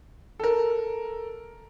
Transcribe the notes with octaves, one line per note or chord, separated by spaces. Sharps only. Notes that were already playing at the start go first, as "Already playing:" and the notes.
A4 A#4